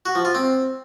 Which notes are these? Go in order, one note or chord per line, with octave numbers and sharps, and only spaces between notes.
F#4
F3
F4
C4